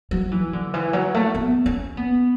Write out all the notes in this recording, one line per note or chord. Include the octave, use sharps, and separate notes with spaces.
F#3
E3
D3
E3
F#3
A3
B3
C#4
B3